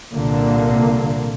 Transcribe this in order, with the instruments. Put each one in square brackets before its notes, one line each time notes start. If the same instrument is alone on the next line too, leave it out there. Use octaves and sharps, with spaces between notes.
[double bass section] C2 A#2 D3 A#3